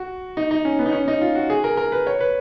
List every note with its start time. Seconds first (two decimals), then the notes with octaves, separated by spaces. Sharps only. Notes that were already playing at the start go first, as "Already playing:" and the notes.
Already playing: F#4
0.37 D#4
0.51 D#4
0.65 C#4
0.79 B3
0.86 D#4
0.93 C#4
1.08 D#4
1.21 F4
1.35 F#4
1.50 G#4
1.64 A#4
1.77 A#4
1.92 B4
2.07 C#5
2.21 B4